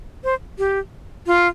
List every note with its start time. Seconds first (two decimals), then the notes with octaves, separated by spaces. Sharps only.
0.24 C5
0.59 G4
1.27 F4